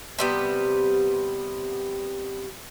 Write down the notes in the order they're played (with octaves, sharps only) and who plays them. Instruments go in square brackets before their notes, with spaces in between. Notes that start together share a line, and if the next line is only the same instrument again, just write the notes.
[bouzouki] C3 G3 B3